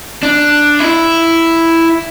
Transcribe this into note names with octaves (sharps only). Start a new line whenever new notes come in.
D4
E4